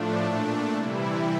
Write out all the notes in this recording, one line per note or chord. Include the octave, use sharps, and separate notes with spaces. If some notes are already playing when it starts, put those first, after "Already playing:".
Already playing: A2 F3 A3 D4
A#2 A3
C3 E3 G3 E4